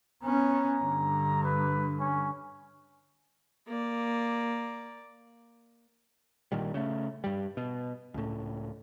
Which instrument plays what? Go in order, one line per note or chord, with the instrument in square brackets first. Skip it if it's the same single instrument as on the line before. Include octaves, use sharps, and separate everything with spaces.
[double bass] B3 C#4 [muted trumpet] A#5
[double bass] G2 D3
[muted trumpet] B4
C#4
[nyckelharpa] A#3 D5
[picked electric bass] A#1 A#2 D#3 G3
C#3 A3
G2 G3
B2
C#2 A2